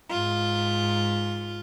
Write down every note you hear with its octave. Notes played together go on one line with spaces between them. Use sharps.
G#2 F4